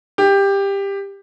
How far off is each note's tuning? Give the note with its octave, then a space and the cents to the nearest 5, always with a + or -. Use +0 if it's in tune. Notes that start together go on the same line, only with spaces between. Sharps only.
G4 +15